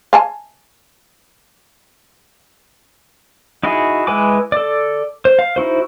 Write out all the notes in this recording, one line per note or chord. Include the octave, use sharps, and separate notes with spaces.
F5 G#5 A5
D#4 E4 F#4 G#4
G#3 E4 B4 G#5 D6
A4 D5
C5
F5
D#4 E4 F#4 C5